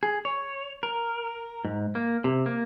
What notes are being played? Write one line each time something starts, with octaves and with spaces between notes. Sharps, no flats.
G#4
C#5
A#4
G#2
A#3
C3
A#3